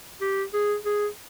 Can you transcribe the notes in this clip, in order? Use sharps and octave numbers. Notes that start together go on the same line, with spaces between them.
G4
G#4
G#4